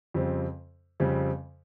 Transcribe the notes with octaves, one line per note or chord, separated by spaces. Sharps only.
F2 C#3 G3 C4
F2 C#3 G3 C4